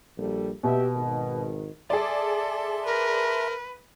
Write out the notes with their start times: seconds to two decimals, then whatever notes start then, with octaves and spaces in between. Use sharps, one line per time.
0.18 A#1 G3 A4
0.63 B2 G4 E5 G5
0.95 G#1 D#3
1.90 G#4 A4 D5 E5 A5 C6
2.86 A#4 B4